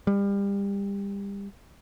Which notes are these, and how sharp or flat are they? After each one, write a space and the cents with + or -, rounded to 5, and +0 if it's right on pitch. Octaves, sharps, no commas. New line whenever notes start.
G3 +30